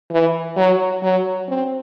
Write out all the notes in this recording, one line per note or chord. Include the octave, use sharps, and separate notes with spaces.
E3
F#3
F#3
C4